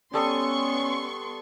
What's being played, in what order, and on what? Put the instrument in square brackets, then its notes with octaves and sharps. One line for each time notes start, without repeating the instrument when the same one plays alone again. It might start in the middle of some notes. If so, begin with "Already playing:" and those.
[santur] G3 A4 D#6 [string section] B3 C6 C#6 [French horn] C#4